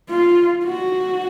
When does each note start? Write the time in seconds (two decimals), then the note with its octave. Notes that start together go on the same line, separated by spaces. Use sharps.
0.10 F4
0.65 F#4